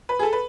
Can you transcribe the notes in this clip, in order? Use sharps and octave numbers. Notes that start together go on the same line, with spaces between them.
B4
G#4
A4
B4